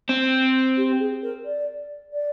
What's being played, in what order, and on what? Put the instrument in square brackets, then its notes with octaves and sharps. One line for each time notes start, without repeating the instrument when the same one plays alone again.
[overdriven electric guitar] C4
[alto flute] G4
G#4
A#4
D5
D5